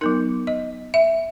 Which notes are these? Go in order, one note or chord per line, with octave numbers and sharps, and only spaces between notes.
F#3 B3 D#4 A#4
D#5
E5